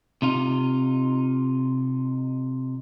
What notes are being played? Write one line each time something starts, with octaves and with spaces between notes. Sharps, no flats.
C3 D#4 F4